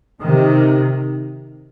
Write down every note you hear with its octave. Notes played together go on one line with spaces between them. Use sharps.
C3 D#3